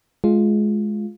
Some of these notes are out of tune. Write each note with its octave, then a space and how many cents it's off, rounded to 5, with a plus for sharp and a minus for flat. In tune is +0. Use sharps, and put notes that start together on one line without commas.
G#3 +20 F4 +0